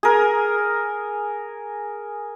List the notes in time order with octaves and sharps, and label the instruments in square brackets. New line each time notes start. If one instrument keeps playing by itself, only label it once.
[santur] G#4 A#4